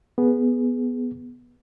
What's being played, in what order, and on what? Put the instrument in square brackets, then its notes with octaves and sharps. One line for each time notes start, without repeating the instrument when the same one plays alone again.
[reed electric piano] B3 G#4